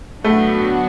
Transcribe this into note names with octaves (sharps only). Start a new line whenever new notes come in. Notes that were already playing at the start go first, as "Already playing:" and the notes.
A2 D3 F#3 A3 B3 D4 F#4